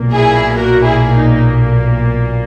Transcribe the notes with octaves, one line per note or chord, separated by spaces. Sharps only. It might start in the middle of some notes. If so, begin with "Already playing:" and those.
Already playing: B1 A#2 A#3
E4 G#4
F#4 A#4
E4 G#4
D#4